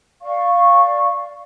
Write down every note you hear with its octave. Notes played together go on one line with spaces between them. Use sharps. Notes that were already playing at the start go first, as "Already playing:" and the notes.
D5 F5 C#6